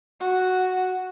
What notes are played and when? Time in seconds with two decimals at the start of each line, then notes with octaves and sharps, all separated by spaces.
0.20 F#4